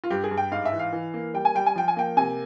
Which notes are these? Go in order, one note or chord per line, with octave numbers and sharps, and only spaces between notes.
F4
G2 G4
G#4
G2
G5
G#2 F5
E5
E3
F5
E3
A#3
G3 G5
G#5
G3 G5
G#5
F3 G5
G#5
A#3 G5
C3 G#5